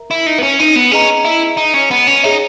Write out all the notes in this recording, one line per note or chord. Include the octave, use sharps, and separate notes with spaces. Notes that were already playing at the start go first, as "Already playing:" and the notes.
Already playing: A#4 E5 A#5
E4
D#4
B3
C#4
D#4
B3
C#4 G#4 B4 D#5 A#5
E4
D#4
C#4
B3
C#4
D#4 G#4 C#5 E5